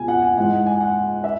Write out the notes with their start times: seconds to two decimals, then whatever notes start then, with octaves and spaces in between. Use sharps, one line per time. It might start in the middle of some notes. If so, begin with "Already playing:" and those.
Already playing: C#2 B2 G#5
0.08 F#5
0.22 G#5
0.37 G#2 E3 F#5
0.66 G#5
0.81 F#5
1.24 E5